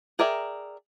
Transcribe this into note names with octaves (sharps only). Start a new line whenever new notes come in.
G#4 A#4 D5 E5 G5